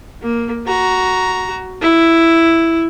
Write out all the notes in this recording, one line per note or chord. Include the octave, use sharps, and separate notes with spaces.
A#3
F#4 A#5
E4